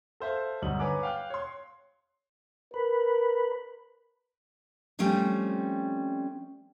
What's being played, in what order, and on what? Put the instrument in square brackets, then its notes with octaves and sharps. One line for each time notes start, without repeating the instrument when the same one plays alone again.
[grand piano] A4 C5 E5 F5
D2 G2 F#3 D#4 F#7
B4 C#5 G#5 A#5 D6 F#6
F5 G5 F#6
C#5 C6
[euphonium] A#4 [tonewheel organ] B4
[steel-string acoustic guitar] F3 G3 A3 C4 C#4